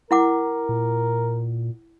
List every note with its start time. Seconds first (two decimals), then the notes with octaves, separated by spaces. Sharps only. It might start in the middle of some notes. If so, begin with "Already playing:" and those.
0.11 E4 A#4 F#5 D6
0.69 A#2